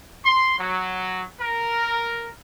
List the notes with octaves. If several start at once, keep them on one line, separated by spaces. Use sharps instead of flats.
C6
F#3
A#4